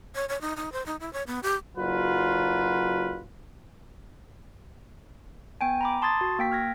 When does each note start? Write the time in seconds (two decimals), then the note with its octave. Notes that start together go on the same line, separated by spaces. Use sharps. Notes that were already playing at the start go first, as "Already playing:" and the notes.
0.15 C#5
0.29 C#5
0.41 D#4
0.57 D#4
0.72 C5
0.86 D#4
1.00 E4
1.13 C#5
1.27 B3
1.43 G4
1.77 F#1 F#3 F4 B4
5.61 B3 G5 G#5
5.81 A#5 B5 D6
6.02 A5 C6 D#6 G#6 A6
6.21 F#4
6.39 A#3 G5 B6
6.52 F6 G#6 A#6